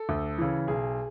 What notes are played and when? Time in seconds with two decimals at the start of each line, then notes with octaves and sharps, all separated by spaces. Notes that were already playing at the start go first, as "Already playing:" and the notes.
Already playing: A4
0.09 D2
0.38 C#3 E3
0.67 B1 G#4